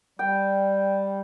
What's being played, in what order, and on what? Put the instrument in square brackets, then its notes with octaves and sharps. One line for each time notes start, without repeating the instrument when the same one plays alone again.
[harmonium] G3 [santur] G5